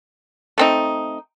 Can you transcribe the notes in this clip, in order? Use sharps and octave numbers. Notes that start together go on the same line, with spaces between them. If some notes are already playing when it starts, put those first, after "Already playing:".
A3 C4 D#4